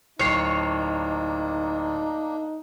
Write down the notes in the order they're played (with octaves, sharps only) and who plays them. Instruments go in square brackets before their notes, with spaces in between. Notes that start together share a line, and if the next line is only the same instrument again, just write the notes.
[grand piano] D1 C7 [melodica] A#3 D4 [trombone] D#4 [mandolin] C#5